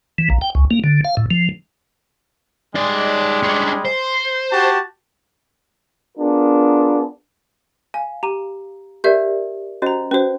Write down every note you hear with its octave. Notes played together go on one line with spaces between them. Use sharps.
E3
A#1
G5
C#2
A#3
D3
F5
A2
F3
G3 G#3 D#4 D5
C#4 D4
C5
F#4 G4 A5
B3 D4 F4 G#4 A#4
F5 G#5
G4 A#5 D#7
G4 A#4 D5 E5 G6
C#4 F#4 C5 D#5 A#5
C#4 F#4 B4 C5